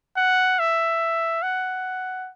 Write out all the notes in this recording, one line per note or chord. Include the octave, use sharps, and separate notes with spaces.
F#5
E5
F#5